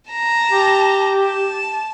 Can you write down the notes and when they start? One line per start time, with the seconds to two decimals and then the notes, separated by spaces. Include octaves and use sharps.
0.11 A5 A#5
0.51 G4
1.20 A5